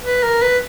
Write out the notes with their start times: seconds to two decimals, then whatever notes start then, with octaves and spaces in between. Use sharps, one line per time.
0.04 B4
0.23 A#4
0.42 B4